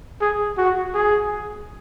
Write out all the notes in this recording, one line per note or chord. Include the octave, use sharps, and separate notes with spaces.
G#4
F#4
G#4